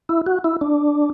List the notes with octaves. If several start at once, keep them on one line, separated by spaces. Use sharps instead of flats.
E4
F#4
E4
D4